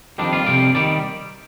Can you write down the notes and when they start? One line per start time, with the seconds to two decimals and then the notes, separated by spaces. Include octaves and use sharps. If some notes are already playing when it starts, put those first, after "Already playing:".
0.18 F2 D#3 G3 D4
0.33 F4
0.46 F2 C3 G3 D5
0.75 D#3 G3 D5